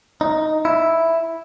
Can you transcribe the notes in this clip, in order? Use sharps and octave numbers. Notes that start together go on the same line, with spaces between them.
D#4
E4